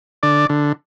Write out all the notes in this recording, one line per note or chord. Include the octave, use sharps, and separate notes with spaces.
D3 D5
D3